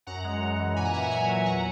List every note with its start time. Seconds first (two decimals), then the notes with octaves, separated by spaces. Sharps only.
0.07 F#2 F#5 A#5
0.24 G#3
0.42 F#2
0.59 E3
0.76 A#2 G#5 B5
0.85 F#5 A#5
0.94 A#2 E5 G#5
1.02 F#5 A#5
1.11 F#3 E5 G#5
1.29 F#3
1.46 E2 F#5 A#5